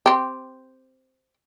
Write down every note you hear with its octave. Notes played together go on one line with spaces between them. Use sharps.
C4 G4